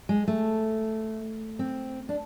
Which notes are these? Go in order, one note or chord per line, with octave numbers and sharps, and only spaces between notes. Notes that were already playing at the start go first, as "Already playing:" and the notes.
G#3
A3
C4
D4